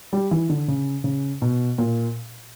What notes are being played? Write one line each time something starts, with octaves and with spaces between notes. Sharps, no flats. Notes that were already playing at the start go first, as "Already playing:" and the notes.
G3
E3
D3
C#3
C#3
B2
A#2